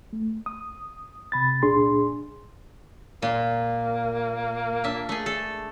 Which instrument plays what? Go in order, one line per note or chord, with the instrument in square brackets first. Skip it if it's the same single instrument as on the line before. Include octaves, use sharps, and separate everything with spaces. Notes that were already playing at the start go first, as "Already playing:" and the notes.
[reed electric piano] A3
D#6
C3 B5 A6
C#2 A#2 D4 G#4 C6
[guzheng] A#2 C6 [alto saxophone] A#3
[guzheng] D4 E5 A5
A3 G#4
A4